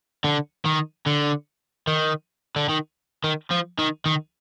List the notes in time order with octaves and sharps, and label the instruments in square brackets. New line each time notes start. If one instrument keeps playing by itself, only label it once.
[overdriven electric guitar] D3
D#3
D3
D#3
D3
D#3
D#3
F3
D#3
D#3